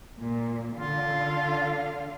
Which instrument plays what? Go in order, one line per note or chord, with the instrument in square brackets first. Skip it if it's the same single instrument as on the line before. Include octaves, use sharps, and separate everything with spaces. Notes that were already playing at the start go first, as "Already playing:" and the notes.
[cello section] A#2
[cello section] D3 F5 [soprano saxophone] F4